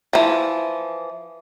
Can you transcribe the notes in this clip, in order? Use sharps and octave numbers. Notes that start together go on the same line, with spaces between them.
E3 F3